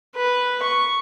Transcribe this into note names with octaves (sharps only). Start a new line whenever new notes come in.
B4
C#6